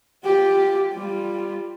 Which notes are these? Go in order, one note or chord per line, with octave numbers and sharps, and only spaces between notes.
F4 G4
G3 F4